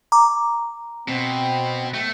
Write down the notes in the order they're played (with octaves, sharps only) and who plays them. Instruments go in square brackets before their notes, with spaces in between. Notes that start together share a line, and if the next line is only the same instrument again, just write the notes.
[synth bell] A#5 D6
[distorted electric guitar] B2 [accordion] C4
[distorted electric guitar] A3